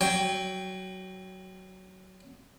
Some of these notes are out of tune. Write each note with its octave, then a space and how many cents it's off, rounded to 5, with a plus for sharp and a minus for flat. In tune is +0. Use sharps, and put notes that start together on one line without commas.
F#3 +15 G5 +0